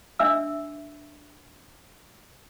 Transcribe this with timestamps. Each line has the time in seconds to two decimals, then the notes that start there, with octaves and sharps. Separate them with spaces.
0.19 D4 E5 E6